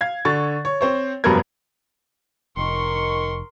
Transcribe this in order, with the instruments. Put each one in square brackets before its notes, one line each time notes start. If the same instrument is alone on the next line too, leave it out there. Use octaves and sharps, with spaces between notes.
[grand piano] F5 G#6
D3 C#6 A6
C#5
C4 C5 C#5
F1 G2 F#3 B3 A#4 G#6
[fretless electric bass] F1 [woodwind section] D#3 C#6 [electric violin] A#4 C6